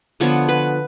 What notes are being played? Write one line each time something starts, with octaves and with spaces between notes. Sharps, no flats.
D3 F3 B3 C#5
B4